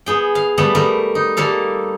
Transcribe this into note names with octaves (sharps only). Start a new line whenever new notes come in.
B3 G#4 G5
F5
G3 A3 B3 A4
G3 A3 A#4
D#4
G3 A#3 A4 F5